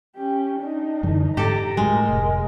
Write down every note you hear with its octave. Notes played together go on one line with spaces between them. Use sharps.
C#4 G4
D4 D#4
F#2 D3 E3
G#2 G4 A4 A#5
A2 F#3 G#3 A#4
F1